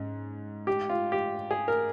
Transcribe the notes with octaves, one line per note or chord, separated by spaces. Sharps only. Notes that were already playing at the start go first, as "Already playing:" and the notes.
Already playing: G#2 C#4
G4
F4
G4
G#4
A#4